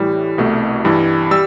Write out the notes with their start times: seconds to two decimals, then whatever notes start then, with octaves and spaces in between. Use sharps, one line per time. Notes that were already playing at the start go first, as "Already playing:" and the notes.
Already playing: A2 E3 G3
0.38 C2 B2 A3
0.85 G2 E3 G3
1.31 G3 E6